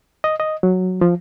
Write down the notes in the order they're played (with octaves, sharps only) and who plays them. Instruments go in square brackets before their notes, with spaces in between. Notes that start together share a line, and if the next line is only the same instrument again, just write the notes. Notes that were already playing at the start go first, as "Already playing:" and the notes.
[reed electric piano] D#5
D#5
F#3
F3